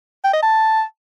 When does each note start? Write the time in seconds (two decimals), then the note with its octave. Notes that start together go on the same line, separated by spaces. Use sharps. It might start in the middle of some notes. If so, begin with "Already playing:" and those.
0.24 G5
0.33 D#5
0.43 A5